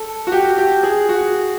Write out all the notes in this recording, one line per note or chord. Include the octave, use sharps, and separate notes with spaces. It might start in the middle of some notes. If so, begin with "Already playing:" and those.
Already playing: A4
F#4
G4
G4
G#4
F#4